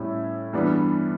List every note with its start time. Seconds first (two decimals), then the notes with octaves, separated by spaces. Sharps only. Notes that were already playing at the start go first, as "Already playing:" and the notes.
Already playing: A2 G3 C#4 E4
0.53 G2 E3 G3 B3 D4